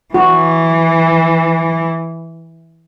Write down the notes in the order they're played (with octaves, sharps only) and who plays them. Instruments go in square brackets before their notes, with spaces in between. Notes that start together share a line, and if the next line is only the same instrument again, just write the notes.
[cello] E3 [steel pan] F#4